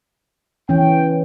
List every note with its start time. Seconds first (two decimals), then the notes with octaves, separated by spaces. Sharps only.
0.69 E3 C#4 G5